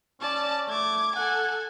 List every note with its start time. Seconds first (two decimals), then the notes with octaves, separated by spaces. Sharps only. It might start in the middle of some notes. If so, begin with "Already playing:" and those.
0.20 C#4 D5 A5
0.69 A3 D6 G#6
1.16 A4 F#5 G#5